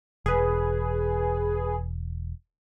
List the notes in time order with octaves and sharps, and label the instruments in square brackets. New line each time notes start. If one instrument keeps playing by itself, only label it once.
[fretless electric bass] E1 [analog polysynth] G#4 B4